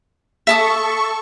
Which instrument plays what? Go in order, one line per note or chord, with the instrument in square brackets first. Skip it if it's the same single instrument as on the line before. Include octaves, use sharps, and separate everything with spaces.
[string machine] A4 C#6 [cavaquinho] E5 A5 D#6